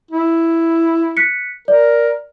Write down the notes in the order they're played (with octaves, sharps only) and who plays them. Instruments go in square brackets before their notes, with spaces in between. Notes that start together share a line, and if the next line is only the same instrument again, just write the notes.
[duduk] E4
[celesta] F#6 B6 C#7
[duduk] A#4 [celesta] D5